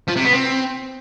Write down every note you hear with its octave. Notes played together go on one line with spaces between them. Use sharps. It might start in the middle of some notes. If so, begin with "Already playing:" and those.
F3
C3
B3
C4